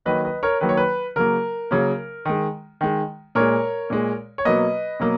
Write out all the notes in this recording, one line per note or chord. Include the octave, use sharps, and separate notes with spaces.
D#3 F#3 A#3 B4 D#5
B4 D#5
A#4 C#5
D#3 F#3 A#3 B4
C#5
B4
C#3 F#3 A#3 A#4
C#3 F#3 A#3
D#3 G#3
D#3 G#3
A#2 G#3 A#4 C#5
A#2 G#3
C#5
B2 F#3 A#3 B4 D#5
B2 F#3 A#3